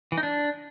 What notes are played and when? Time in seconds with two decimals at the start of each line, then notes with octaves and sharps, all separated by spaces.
0.12 E3
0.18 D#4
0.23 D4